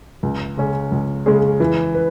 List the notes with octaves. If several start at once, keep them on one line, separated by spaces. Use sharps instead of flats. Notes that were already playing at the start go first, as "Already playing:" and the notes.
C#2
C#3 G#3 C#4 G#4
C#2
C#3 G#3 C#4 G#4
E3
B4